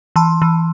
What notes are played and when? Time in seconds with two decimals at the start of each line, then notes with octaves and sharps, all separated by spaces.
0.16 E3 A5 C6
0.42 E3